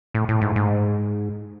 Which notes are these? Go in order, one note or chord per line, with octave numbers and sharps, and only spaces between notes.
A2
A2
G#2
G#2